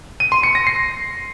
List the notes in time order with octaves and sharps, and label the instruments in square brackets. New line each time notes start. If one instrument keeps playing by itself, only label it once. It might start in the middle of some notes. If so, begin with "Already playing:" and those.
[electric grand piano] D#7
C6
C#7
A#6
C7